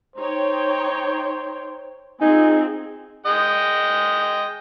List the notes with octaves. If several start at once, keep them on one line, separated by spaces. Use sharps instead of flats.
D#4 C5 C#5 G5
C4 D#4 F4 G#4 G#5
G#3 D#5 G5